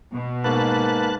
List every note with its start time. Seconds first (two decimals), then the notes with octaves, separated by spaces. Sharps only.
0.11 B2
0.44 G#2 A#3 B4 A5 F#6